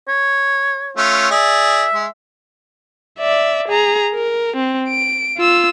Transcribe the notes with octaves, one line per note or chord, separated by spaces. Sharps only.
C#5
A3 C#4 F4
G#4 D5 E5
G#3
D5 E5
G#4 A#5
A#4
C4
D7
F4 E6